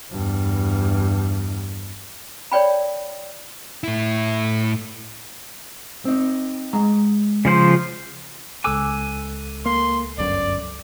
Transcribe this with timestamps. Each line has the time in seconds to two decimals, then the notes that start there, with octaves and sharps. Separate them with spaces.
0.12 E2 G2
2.52 C#5 D5 G5 B5
3.84 A2 E4
6.05 C4 D#4
6.73 G#3 A#5
7.45 C#3 F3 C5
8.64 C#2 A4 G#5 D6 E6 F#6
9.66 A#3 C6
10.18 G1 F#2 D5